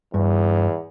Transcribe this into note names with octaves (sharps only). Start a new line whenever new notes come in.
E2 G2